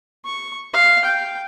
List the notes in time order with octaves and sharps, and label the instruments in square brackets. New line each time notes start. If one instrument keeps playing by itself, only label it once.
[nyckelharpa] C#6
F5
G5